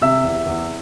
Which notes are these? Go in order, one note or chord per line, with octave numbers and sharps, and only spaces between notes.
C3 E5 E6
E2
E2